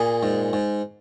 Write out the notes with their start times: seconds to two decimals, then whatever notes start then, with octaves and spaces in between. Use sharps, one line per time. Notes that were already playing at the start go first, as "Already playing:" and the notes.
Already playing: A#2 G#4
0.23 G#2
0.53 G#2